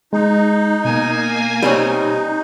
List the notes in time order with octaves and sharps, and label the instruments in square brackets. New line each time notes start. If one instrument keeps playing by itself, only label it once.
[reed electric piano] G#3 [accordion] D#4
[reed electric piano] B2 [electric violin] A#3 G#5
[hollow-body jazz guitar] G3 C4 C#4 [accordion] D#4